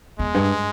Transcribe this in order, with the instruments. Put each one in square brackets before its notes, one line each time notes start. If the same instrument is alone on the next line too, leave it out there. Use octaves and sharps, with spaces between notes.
[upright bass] E2 [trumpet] G#3
[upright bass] G2